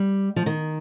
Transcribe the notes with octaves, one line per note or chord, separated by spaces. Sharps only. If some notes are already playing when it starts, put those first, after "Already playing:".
Already playing: G3
F3
D#3